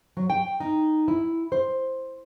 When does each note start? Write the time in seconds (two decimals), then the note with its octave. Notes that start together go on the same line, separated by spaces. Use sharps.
0.17 F#3
0.30 G5
0.60 D#4
1.08 E4
1.52 C5